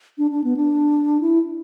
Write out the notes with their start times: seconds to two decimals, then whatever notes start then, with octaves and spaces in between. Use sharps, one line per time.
0.18 D4
0.31 D4
0.44 B3
0.57 D4
1.21 E4